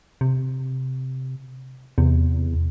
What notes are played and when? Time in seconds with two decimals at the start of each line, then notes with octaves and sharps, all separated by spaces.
0.21 C3
1.98 E2 C3